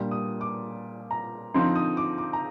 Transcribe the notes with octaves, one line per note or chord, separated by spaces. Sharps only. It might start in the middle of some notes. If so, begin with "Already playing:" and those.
Already playing: A#2 G3 D4
D#6
D6
A#5
D3 F3 C4 D#4 C6
D#6
D6
D6
A#5